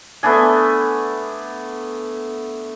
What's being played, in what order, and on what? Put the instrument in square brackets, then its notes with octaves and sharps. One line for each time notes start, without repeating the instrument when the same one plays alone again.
[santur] A3 B3 D4 G#5